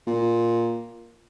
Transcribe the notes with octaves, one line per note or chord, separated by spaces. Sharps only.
A#2